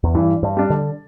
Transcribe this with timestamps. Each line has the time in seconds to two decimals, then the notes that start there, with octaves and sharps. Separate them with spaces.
0.03 E2
0.14 G2 E3
0.43 G2
0.57 G3 D4
0.70 D3